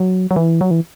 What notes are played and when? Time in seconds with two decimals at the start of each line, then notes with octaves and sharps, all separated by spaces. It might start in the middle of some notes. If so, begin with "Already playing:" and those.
Already playing: F#3
0.31 F#3
0.36 E3
0.61 F#3
0.71 E3